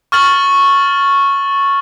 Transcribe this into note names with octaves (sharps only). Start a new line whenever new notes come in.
C#6 F6 A6 F#7